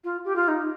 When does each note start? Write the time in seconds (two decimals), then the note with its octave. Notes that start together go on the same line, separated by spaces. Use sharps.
0.04 F4
0.24 G4
0.35 F4
0.48 D#4